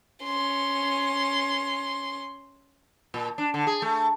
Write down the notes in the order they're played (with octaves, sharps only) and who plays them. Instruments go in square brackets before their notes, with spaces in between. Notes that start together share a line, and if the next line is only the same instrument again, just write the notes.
[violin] C#4 C6
[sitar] A#2
D4
D3
G#4
A3